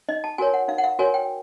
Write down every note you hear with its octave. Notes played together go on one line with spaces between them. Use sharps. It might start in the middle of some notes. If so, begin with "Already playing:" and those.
D#4 D#5
A5
F#4 A#4 C#5 G#5
F#5
D#4 F5
F#5
F5
F#4 A#4 C#5 G#5
G5